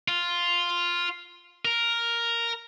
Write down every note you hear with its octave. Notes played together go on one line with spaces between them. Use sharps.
F4
A#4